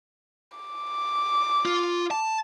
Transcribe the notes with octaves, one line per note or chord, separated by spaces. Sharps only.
D6
F4
A5